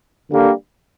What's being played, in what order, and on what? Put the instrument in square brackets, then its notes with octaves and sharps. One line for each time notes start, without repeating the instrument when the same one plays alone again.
[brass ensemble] D3 G3 A#3